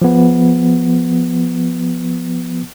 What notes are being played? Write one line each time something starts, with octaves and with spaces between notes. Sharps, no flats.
F3 B3